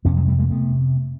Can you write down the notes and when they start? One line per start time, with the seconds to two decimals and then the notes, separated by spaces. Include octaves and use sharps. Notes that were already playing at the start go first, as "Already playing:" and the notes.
0.05 F2 C3 B3 C#4
0.16 F#3 G#3
0.28 G3 A3
0.39 G#3 A#3
0.50 C3 A3 B3